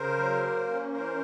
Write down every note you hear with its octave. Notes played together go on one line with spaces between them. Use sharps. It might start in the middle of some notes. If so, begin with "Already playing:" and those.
Already playing: C#3 A#4 C5
F#3
A#3
C#4
E3 A#4 C5